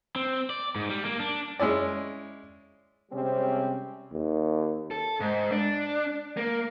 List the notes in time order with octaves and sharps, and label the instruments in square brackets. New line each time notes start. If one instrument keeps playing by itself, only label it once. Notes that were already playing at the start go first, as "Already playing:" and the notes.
[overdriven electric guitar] C4
D5
G#2
G3
A#3
D4
[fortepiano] G#3 C#4 E4 D5
[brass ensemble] C3 G3 G#3 C4 C#4
[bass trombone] D#2
[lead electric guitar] A4
G#2
D4
A#3